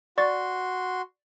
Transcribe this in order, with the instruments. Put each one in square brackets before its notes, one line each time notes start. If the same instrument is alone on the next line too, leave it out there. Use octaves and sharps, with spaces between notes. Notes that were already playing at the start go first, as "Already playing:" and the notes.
[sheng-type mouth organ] F#4 C6 [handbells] D5 C#6 A6